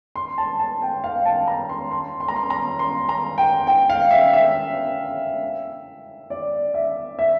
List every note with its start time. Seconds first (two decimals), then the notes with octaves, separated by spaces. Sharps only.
0.16 C6
0.38 A5
0.59 A5
0.82 G5
1.04 F5
1.26 A5
1.48 A#5
1.69 C6
1.91 C6
2.20 C6
2.28 A#5
2.36 C6
2.50 A#5
2.79 C6
3.09 A#5
3.38 G5
3.67 G5
3.90 F5
4.11 E5
4.33 E5
6.30 D5
6.74 E5
7.19 E5